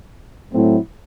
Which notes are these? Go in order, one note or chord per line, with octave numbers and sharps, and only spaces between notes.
A2 F#3 A3 C4 E4